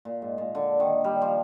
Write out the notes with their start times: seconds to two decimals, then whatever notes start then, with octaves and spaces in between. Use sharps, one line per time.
0.05 A#2
0.22 G#2
0.38 A#2
0.55 D3
0.80 D#3
1.04 G3
1.22 F3